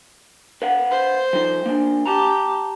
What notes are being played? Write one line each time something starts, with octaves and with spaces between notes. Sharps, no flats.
B4 F5 F#5
C5
F3 D#4
A#3 D4
G4 A5 A#5